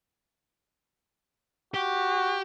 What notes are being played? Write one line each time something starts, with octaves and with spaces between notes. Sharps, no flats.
F#4 G4